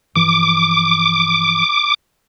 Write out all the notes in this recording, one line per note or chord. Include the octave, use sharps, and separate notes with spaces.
G2 E3 F3 D6